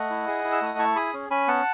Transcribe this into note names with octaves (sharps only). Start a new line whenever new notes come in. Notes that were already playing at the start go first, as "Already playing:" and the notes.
Already playing: A3 D#5 F#5
E4
G#4
E4
E6
A3 D#6
E4 A5 C#6
G#4 B5 D#6
C#4
C#4 G#5 B5
B3 F#5 A5